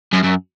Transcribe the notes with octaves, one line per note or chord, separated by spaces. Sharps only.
F#2
F#2